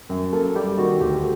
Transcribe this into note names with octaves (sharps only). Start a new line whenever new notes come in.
F#2
A#3 A4
G3 G4
D#3 F#4
D2 G4